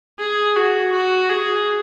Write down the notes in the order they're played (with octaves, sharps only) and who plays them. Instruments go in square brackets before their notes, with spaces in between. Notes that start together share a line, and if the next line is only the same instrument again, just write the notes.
[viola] G#4
F#4
F#4
G#4